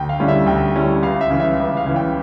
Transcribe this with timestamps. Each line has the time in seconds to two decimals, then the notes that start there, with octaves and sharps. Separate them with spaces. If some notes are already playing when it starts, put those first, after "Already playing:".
Already playing: D2 G5
0.09 F5
0.19 D3 G3 C#4 E4
0.28 E5
0.46 D2 G5
0.75 D3 G3 C#4 E4
1.02 C#2 F5
1.21 E5
1.30 C#3 E3
1.40 E5
1.59 C#2
1.77 F5
1.86 C#3 E3
1.96 G5